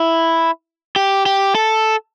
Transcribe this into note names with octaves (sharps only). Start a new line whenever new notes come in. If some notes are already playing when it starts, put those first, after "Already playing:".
Already playing: E4
G4
G4
A4